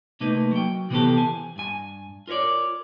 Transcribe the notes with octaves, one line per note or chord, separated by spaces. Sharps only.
C3 A3 A#3 D#4 B4
F#3 G5
C3 E3 B3 C4 G4 A4
G#5
G2 G#5
F4 A#4 B4 C#5 D5